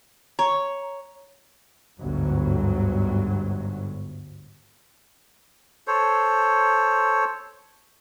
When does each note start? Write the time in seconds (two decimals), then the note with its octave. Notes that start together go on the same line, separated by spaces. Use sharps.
0.39 C#5 A#5
2.00 G1 D2 G#2 F#3
5.87 A4 C5 C#5